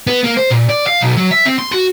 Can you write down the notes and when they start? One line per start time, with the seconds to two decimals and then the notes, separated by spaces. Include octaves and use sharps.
0.07 B3
0.24 A#3
0.37 C5
0.51 A#2
0.70 D5
0.87 F5
1.01 B1
1.17 F#3
1.31 E5
1.46 C4
1.59 C6
1.72 F#4